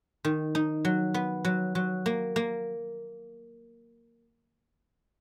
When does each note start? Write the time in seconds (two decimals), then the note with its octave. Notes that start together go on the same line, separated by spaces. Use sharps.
0.25 D#3
0.55 D#4
0.85 F#3
1.14 B3
1.45 F#3
1.75 F#3
2.06 A#3
2.36 A#3